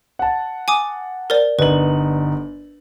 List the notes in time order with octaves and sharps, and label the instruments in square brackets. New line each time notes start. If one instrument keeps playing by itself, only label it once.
[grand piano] F#5 A5
[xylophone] G#5 D6 D#6
A#4 C5 D5
[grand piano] G1 D#4 F#7 [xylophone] B4